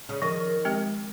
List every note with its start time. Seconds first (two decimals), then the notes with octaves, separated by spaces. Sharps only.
0.09 C#3
0.22 D#3 F3
0.65 G#3 C4 G4 A#4